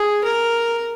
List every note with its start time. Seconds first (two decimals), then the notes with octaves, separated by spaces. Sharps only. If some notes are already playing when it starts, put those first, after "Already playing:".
Already playing: G#4
0.24 A#4